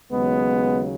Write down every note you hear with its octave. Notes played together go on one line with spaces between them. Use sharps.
D#2 C#3 F#3 G#3 B3